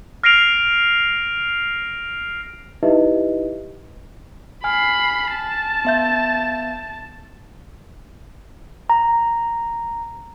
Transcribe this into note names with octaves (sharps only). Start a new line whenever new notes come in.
F6 A#6 C7 D7 F7
D#4 E4 G4 B4 D#5 E5
G#5 B5 F6 C7
A5
B3 E5 G6
A#5